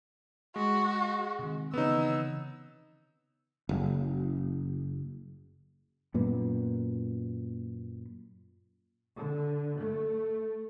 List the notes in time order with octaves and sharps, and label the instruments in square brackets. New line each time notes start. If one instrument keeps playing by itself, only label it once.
[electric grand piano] G#3 [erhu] F#4
[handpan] C3 D#3
[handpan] C#3 E3 C#5 [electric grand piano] B3 D#4 [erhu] E6
[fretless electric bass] F#1
F#2 A#2 B3
[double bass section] D3
A3